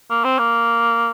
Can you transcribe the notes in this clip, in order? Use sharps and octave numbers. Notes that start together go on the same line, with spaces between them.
A#3
C4
A#3